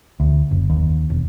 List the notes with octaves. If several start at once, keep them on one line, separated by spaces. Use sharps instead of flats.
D2
F#1
D#2
E1